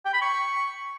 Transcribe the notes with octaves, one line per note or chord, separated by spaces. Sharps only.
G5
B5
C#6